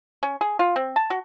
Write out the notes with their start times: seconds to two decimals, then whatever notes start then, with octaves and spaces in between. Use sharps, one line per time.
0.23 C#4
0.41 G#4
0.59 F4
0.76 C4
0.96 A5
1.10 F#4